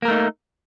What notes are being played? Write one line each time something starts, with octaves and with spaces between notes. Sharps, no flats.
A3 A#3 D#4 A#4